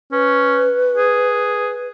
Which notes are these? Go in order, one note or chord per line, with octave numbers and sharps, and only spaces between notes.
C#4 B4
G#4